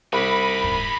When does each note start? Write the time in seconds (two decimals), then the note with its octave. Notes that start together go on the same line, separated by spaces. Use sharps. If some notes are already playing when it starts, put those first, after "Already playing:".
0.13 C2 D#4 G4 B5
0.64 D1 G2